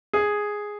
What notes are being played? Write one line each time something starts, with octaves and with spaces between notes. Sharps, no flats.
G#4